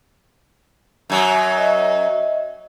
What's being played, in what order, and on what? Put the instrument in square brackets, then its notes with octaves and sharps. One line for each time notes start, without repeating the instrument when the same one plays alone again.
[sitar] F#2 F#3
[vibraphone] D#5 E5